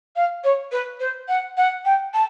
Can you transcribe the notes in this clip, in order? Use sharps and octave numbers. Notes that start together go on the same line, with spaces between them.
F5
C#5
B4
C5
F#5
F#5
G5
A5